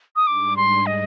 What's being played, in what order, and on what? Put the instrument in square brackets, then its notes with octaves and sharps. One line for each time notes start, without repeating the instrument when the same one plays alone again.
[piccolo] D#6
[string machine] G#2 G3 D4 G#4 [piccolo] D6
[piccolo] C6
D#5